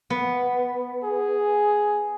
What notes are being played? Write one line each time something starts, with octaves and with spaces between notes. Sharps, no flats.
B3
G#4